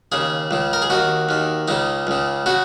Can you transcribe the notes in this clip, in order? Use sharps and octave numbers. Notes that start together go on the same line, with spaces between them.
D#2 C#3 G#4
C#2 C#3
A#4
G#4
D#2 D#3 F#4
D#2 D#3
C#2 C#3 D#4
C#2 C#3
C#3 F#4